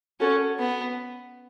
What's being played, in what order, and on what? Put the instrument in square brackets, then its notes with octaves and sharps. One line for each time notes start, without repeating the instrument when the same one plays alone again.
[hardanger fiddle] C#4 [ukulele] F#4 A4 C#5
[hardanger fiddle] B3